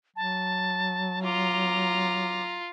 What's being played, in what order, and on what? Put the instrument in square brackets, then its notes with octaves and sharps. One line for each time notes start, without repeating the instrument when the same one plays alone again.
[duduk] F#3 [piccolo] A5
[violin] F4 [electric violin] A#5 [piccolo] D6